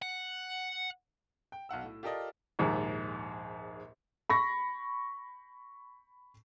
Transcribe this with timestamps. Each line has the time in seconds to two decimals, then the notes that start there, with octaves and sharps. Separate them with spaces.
0.02 F#5
1.52 G5
1.69 B1 F5 F#5 E6
1.84 A2
2.03 F4 G4 A4 A#4 D5 D#5
2.59 A#1 D#2 G#2
4.30 B5 C#6 A#6